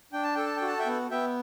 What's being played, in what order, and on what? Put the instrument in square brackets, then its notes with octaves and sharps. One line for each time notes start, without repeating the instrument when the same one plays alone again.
[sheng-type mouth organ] D4 G5
A5
A4 G5
A5
G5
F#4
A5
E5 G5
B3
B3 E5 G5